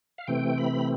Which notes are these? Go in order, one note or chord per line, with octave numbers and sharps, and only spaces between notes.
F5
C3 E3 A3 C4 G5
B5